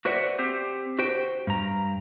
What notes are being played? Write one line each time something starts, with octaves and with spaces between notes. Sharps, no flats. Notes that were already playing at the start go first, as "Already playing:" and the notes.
F#4 B4 C5 D5 E5 F#5
C4 G4 C5
F#4 G4 C5 G5
G2 A#5